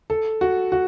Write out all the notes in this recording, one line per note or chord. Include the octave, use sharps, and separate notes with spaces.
A4
F#4
F#4